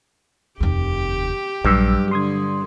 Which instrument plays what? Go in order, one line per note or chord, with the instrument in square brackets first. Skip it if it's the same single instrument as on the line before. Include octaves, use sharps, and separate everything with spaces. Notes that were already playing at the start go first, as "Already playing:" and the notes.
[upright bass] F1 D#2 [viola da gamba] G4
[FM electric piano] A#1 E6 [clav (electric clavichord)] G2 [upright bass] F#3
[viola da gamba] D3 [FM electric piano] C6 D#6 G#6